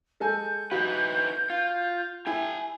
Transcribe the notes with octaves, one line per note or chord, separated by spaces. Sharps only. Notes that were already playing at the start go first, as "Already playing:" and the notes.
G#3 A4 G#5 G6
D#4 E4 F#4 B4
F4
E4 G4 G#5